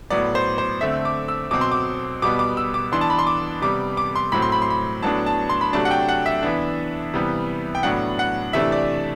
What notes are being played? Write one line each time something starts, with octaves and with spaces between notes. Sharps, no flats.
A2 F#3 B3 D5
C5
C5
D3 A3 C4 E5
D6
E6
B2 F#3 C4 D6
C6
D6
B2 G3 B3 D6
D6
E6
D6
E3 B3 D4 C6
A5
B5
C6
D6
C3 G3 B3 D6
D6
C6
A2 F#3 C4 B5
C6
B5
C6
B5
A2 F#3 B3 D4 A5
A5
C6
B5
C3 F#3 A3 D4 A5
F#5
G5
F#5
E5
E3 B3 D4
C3 E3 G3 B3
G5
A2 F#3 B3 D4 F#5
F#5
C3 E3 A3 D4 E5
D5